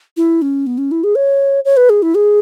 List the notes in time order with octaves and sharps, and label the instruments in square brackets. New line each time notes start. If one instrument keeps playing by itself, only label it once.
[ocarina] E4
C#4
B3
C#4
E4
G#4
C#5
C#5
B4
G#4
E4
G#4